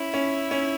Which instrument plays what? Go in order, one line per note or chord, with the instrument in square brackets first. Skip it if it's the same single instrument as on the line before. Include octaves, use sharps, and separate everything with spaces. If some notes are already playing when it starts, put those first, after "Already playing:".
Already playing: [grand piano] C#4 [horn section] E4
[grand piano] C#4
C#4